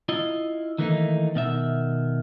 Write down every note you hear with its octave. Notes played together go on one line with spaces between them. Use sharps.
E4 F4 D#5
D#3 E3 A3 A#3 C#4 D#4
B2 D#3 E5